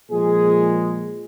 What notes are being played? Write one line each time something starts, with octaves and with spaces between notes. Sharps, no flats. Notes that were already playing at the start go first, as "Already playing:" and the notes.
A#2 F3 G#3 G#4